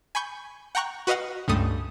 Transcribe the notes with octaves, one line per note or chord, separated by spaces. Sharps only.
G#5 B5 C#6 G6
F#5 G5 A#5 C#6 F#6
F#4 B4 D#5 F5 F#5
C#2 G2 A3 D#6